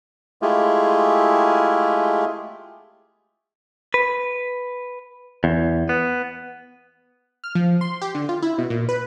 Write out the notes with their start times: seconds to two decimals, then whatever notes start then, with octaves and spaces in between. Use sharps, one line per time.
0.42 G#3 A3 E4 F4 G4 G#4
3.94 B4
5.44 E2
5.89 B3
7.44 F6
7.55 F3
7.81 C6
8.02 G4
8.15 D3
8.29 F4
8.42 E4
8.58 B2
8.70 A#2
8.89 B4